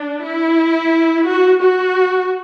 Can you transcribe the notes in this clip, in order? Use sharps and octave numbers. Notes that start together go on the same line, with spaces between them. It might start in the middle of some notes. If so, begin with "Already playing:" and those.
Already playing: D4
E4
F#4
F#4